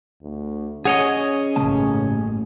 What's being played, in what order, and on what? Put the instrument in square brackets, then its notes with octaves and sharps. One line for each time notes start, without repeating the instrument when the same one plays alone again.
[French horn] D2
[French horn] C#4 [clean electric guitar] G#4 C#5 D#5 [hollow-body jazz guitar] F#5
[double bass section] A1 G2 [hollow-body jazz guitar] C#3 A#3 A5